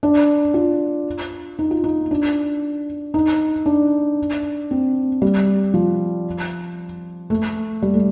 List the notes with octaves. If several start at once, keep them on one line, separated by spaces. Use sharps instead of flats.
D4
F4
D#4
F4
D#4
D4
D#4
D4
C4
G3
F3
A3
G3
A3